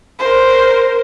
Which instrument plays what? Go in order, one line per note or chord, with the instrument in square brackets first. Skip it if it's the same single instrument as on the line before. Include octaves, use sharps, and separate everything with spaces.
[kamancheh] A#4 C5